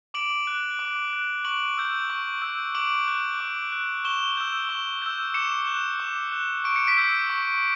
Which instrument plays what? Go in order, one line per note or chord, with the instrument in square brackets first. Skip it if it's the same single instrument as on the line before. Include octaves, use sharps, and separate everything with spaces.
[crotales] D6 D7 F#7
F#6
D6
F#6
C#6 D7 F#7
E6 G6
C#6
E6 G6
D6 D7 F#7
F#6
D6
F#6
C#6 E7 G7
E6 G6
C#6
E6 G6
D6 C#7 E7
F#6
D6
F#6
C#6 D7
C#7
B6 D7
E6 G6
C#6